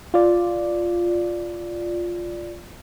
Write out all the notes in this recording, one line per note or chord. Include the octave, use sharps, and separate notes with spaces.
F4 D5